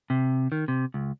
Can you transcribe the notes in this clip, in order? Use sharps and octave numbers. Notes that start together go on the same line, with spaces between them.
C3
D#3
C3
C#2